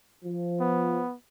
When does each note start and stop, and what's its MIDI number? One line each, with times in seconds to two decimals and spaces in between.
0.25 1.02 53
0.60 1.15 59